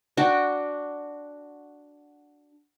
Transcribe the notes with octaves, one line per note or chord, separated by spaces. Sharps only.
D4 F#4 G5